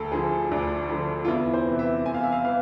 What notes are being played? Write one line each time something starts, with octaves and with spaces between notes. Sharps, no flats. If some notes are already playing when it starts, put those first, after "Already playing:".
Already playing: D2 A4
D3 F3 G#4
D2 D4
D3 F3
F4
E2 E4
C5
C3 E3
E5
E2 G#5
F5
E5
F5
E3 F5